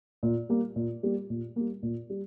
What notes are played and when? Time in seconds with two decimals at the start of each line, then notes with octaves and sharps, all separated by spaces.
0.23 A#2
0.49 G3 A#3
0.76 A#2
1.03 G3 A#3
1.30 A#2
1.56 G3 A#3
1.83 A#2
2.10 G3